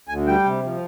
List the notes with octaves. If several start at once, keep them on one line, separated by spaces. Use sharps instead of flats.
D2 G#5
G3 G5
C3
F3